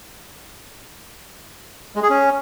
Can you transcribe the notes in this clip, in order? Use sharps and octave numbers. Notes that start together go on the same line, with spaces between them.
G#3
G#4
C#4